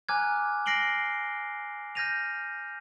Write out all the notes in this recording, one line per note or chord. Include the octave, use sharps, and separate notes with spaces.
G#5 A#5 D6 F6 F#6 G#6
F6 A#6 C7 D7 F#7 G7
F6 G6 G#6 A#6 D#7 F7